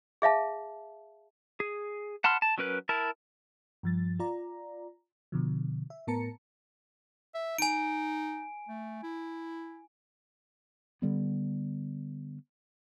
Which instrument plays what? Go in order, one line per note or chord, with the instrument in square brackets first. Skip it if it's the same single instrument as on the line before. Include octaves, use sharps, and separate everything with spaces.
[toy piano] G#4 E5 F5 A5
[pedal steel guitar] G#4
F#5 A5 B5 C6 F6
A5
F#3 C#4 A#4 B4 F#6
E4 A#4 A5
[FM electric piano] G2 F3 A6
F4 D5 A#5
B2 D3 F3
E5
A2 B3 A#4 A5 A#5 C#7
[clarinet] E5
[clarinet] D#4 [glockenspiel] G#5 D7
[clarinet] A3
E4
[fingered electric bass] D3 G3 B3